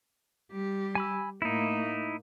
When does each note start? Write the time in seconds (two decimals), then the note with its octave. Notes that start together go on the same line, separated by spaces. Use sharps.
0.52 G3 G4
0.95 G#5 B5 E6
1.42 A2 A#3 D#4 E4